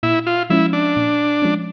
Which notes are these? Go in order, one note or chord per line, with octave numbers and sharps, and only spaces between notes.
A#2 E4
F4
F3 G#3 C#4 E4
D4
A#2
F3 G#3 C#4